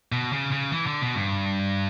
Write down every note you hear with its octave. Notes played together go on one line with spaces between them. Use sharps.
B2
C#3
C#3
E3
D3
B2
G2